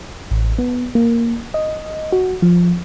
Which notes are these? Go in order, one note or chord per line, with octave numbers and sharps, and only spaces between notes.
A1
B3
A#3
D#5
F#4
F3